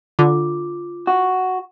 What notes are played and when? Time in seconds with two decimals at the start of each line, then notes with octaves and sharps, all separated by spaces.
0.19 D3 F4 D6
1.07 F#4